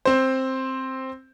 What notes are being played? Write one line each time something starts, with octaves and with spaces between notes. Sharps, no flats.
C4 C5